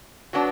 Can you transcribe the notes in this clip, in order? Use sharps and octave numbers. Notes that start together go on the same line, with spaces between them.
F#3 B3 D4